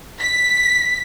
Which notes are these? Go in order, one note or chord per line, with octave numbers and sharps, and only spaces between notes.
B6